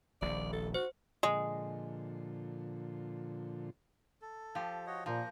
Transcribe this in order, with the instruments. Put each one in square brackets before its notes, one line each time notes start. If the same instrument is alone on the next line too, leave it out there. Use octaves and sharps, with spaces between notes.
[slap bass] D#1 A#1 D#2 [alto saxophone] D5
[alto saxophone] A4
[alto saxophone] F#4 [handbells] C5
[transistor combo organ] A#2 D3 F3 [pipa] G#3
[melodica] A4
[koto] F3 G4
[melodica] F#4 C#5 D#5
[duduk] A#2 [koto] F3 [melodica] A#3 C5 A#5